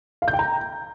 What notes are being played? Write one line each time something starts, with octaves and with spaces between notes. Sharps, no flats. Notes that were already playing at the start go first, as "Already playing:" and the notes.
F5
G6
G5
A#5